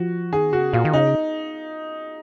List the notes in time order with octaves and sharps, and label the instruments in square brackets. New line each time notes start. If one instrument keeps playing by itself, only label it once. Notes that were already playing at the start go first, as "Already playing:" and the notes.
Already playing: [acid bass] F3 [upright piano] F#4
[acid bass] D#3 [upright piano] G#4
[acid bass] C#3 [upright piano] F#4
[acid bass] A#2 [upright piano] F4
[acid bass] D#3
[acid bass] C#3 [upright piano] D#4